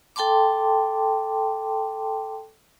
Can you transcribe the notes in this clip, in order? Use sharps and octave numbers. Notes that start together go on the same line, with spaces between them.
A4 G5 A5 C6 D6